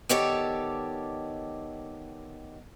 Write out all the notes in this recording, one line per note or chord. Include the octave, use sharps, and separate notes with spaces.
D#3 B3 G4 A4 C#5 D5